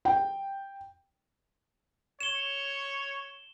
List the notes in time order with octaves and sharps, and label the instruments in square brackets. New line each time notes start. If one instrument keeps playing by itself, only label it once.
[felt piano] G5
[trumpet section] C#5 [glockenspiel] E7 G7